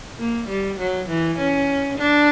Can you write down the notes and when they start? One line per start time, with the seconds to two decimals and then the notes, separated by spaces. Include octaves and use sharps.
0.19 A#3
0.49 G3
0.79 F#3
1.08 E3
1.38 C#4
1.98 D4